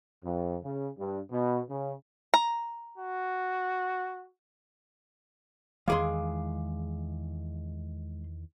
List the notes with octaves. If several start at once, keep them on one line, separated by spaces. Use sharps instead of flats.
F2
C#3
G2
B2
C#3
A#5
F#4
E2 D#3 E3 G#3 G#4 F5 C6 D6